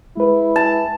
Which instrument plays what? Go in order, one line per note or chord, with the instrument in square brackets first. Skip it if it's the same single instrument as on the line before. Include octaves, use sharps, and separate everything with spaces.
[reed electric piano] G#3 B4 [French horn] E4
[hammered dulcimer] A5